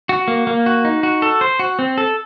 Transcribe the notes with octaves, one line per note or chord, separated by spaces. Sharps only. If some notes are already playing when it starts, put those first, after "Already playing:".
F#4
A#3
A#3
F#4
D#4
F#4
A4
C5
F#4
C4
A4